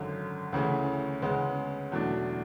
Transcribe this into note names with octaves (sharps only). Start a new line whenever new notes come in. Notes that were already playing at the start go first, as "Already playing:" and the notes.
Already playing: G#1 F#2 D3
D2 C#3 E3 A3
D2 C#3 G#3 B3
E2 B2 F#3 A3 D4